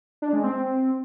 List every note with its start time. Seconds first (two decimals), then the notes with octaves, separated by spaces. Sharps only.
0.22 D4
0.33 G#3
0.44 C4